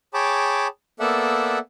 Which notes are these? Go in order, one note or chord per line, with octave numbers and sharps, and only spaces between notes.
G#4 C#5 G5 A5 B5 D6
A#3 B3 A4 D5 E5 F#5